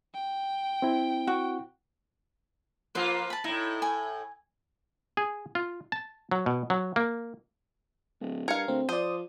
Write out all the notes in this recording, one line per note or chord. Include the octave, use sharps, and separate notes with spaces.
G5
C4 E4
F#4
F3 A#3 F4 B4 C5
A5 B5
A2 D#4 E4
G#5
G#4
F4
A5
F#3
B2
F#3
A#3
D1
G2 A#4 F5 G#6 C#7
D2 C4
F3 C5 D5 D#6